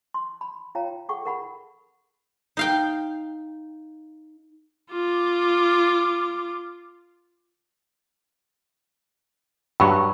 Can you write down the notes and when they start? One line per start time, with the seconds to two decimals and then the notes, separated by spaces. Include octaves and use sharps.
0.14 C6
0.41 B5
0.75 F4 C#5 F5 G5 A#5
1.09 G#4 A4 F#5 G5 C#6
1.25 A#4 F#5 B5
2.57 D#4 F5 G5
4.92 F4 D6
9.80 G2 F#3 G5 B5 C#6